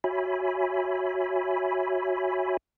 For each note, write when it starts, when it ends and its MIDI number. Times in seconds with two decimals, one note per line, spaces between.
0.04 2.57 66
0.04 2.57 73
0.04 2.57 76
0.04 2.57 80
0.04 2.57 83